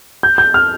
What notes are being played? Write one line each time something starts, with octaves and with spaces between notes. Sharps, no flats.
G6
G6
F6